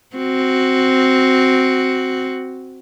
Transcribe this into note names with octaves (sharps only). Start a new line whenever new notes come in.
C4 F#4